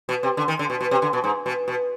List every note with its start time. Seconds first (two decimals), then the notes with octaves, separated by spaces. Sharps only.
0.09 B2
0.23 C3
0.37 D3
0.48 D#3
0.59 D3
0.70 B2
0.81 B2
0.91 C3
1.02 D3
1.13 B2
1.24 G#2
1.46 B2
1.68 B2